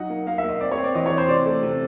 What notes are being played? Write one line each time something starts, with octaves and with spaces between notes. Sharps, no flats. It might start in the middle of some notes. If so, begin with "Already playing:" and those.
Already playing: F#3 D#4 F#5
A#3
A#3 F5
E5
A#3
D#5
C4 D5
C#5
C4
D5
E3 D#5
C#5
C4
C5
C3 D5
A3
C3